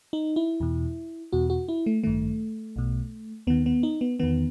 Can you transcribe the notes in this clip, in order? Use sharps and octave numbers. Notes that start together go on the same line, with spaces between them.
D#4
E4
E2 B2
E2 B2 F#4
F#4
E4
A3
A1 G2 D#3 A3
B1 B2
D#2 D#3 B3
B3
D#4
B3
E2 D#3 B3